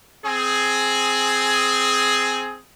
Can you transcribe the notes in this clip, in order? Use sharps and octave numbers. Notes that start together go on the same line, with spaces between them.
C4 G#4